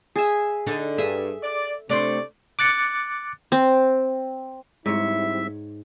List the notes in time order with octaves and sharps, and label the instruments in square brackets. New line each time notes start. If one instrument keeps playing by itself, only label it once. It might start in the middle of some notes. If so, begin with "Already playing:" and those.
[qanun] G#4 E5
[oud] D3 D4 D#4
[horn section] G2 [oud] G#4 [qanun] E5
[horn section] D5
[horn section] C3 D5 [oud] A3 D4 C5
[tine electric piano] D6 F#6 A6 C#7
[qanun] C4
[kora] G#2 C#5 [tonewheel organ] G3 C4 [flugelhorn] E4 [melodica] E5